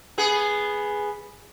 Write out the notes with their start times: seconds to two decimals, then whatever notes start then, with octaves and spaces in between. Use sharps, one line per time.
0.18 B3 G#4